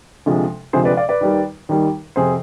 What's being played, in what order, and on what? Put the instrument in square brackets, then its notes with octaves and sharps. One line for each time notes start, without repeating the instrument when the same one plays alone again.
[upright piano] D2 C3 F3 G#3
D2 C3 F3 G#3 G#4 C5
B4 D5
D5 F5
B4 D5
D#2 D#3 G3
D#2 D#3 G3
F2 C3 G#4 C5